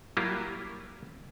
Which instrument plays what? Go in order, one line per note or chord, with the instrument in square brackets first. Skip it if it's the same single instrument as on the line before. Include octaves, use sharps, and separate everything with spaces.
[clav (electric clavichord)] F#3 G3 A#3 E4 F4